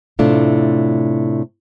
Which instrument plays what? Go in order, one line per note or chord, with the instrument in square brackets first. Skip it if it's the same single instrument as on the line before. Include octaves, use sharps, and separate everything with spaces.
[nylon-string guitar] A2 C3 A3 D4 F4